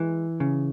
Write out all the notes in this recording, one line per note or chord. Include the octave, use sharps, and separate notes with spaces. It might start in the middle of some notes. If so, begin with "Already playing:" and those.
Already playing: E3 G#3
C#3